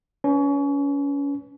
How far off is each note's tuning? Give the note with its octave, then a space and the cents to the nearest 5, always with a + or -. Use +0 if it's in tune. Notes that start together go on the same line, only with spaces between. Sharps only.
C#4 +30 B4 +0